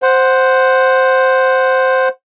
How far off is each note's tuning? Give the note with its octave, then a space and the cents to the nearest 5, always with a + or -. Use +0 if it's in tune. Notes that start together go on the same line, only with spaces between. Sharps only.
C5 +0 F#5 +0